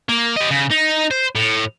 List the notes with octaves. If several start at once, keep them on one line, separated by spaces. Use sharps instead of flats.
A#3
G4 D#5
C#3
D#4
C5
A2